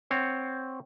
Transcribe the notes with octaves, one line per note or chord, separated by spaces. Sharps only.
C4 C#5 F#5